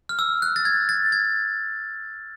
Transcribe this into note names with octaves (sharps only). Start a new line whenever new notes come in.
F6
E6
F#6
A6
G#6
A6
G#6